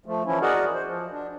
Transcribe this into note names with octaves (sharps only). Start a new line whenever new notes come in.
F3 A3
E3 F3 C#4 E4
F#4 G#4 A#4 D5 D#5 F#5
C5
F3
D4